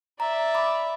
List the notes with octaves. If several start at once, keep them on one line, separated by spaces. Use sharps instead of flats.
D5 E5 A#5
B5 D6